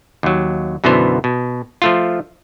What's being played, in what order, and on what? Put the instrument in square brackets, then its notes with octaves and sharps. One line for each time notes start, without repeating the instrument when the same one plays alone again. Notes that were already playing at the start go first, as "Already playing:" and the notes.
[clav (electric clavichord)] D#2 F#3
F#2 B2 D3 E3 B3 C5
B2
F3 A3 F4